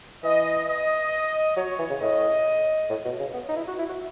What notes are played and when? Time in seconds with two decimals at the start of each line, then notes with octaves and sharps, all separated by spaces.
0.23 E3 D#5
0.67 D#5
1.56 F#3 C#5
1.79 E3
1.90 C#3
2.00 A2 D#5
2.90 A2
3.05 B2
3.20 C#3
3.34 B3
3.49 D#4
3.56 E4
3.68 F#4
3.79 E4
3.89 F#4